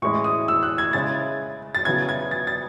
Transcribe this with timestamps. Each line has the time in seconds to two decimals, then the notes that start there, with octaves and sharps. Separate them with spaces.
0.02 A2 E3 G#3 C#4 E4 C#6
0.24 D#6
0.48 E6
0.63 F#6
0.78 G#6
0.93 C#3 G#3 C#4 E4 A6
1.75 A6
1.85 C#3 F#3 B3 E4 G#6
2.09 G#6
2.31 A6
2.47 A6